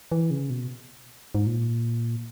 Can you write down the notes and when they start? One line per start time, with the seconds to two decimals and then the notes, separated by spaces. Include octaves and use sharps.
0.12 E3
0.31 C#3
0.50 B2
1.35 G#2
1.47 A#2